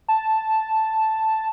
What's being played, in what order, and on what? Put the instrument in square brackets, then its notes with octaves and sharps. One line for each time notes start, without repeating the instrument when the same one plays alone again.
[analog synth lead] A5